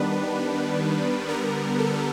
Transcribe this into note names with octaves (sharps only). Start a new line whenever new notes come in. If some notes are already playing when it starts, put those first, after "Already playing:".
Already playing: D#3 G3 B3 D4 B4
D3 G3 B3 A#4
A4